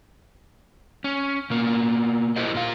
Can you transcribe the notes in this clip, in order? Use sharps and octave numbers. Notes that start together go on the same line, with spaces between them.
C#4
B2 A#3
E4 G4 A#4 C5 D#5
A#2 F4 F5